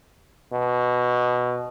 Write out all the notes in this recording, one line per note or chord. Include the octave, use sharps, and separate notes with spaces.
B2